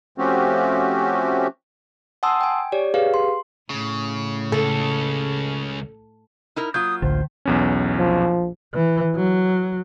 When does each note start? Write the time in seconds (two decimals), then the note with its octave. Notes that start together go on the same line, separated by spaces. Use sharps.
0.18 F3 A3 C4 C#4 F#4 G4
2.23 F#5 G#5 A5 C6 D#6 E6
2.41 G5 G#5
2.72 G4 C#5 D5
2.94 G4 G#4 B4 F5
3.14 C6
3.70 A2 C#3
4.52 C#2 A4
6.56 D#4 E4 A#4
6.74 F#3 A#3 F4 D#6 G6
7.02 A1 D2 D3 C5
7.45 B1 E2 C#4
7.98 A#1 F3
8.74 E3
9.15 F#3